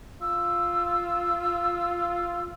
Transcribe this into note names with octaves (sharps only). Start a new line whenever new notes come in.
F4 E6